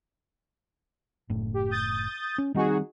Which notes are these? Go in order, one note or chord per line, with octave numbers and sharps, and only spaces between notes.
F#1 A2
G4
D#6 G6 A6
C#4
D#3 G3 C4 D#4 F#4 G#4